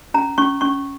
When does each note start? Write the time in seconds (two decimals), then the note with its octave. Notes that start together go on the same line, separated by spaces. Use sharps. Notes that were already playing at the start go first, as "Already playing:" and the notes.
0.14 C#4 A#5
0.38 C#4 C#6
0.61 C#4 C#6